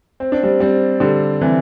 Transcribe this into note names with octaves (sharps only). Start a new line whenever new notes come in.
C4
D4
G3 C4
G3 C4
D3 G3
C3 E3